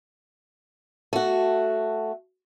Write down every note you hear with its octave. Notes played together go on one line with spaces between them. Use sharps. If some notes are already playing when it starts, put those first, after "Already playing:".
A3 F#4